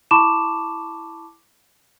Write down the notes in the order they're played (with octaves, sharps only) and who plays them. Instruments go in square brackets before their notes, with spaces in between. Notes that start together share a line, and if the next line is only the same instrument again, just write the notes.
[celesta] E4 A5 B5 C#6 D6 E7